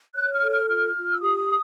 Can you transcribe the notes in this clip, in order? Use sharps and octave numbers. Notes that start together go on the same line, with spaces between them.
C#5 F#6
F6
A4
F6
F4 F6
F4
E6
G4 D#6